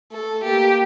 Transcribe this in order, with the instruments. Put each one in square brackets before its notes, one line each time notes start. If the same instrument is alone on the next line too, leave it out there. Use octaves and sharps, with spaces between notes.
[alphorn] A3 [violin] A4
[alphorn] A#3 [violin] G4